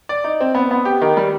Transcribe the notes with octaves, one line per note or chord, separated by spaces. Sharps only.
D5
D#4
C4
B3
B3
G4
D#3
G3